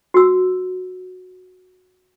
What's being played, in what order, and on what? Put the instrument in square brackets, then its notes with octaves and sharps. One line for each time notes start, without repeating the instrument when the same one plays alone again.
[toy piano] F#4 E6